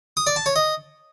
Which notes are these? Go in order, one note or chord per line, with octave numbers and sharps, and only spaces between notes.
D#6
D5
A5
C#5
D#5